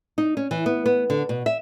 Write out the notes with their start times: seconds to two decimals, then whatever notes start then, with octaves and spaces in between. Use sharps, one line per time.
0.18 D#4
0.37 C#4
0.51 E3
0.66 B3
0.86 B3
1.10 D3
1.29 B2
1.46 E5